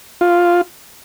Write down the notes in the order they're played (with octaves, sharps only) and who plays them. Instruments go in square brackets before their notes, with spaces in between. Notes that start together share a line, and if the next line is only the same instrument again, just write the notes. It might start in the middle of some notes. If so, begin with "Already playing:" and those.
[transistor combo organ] F4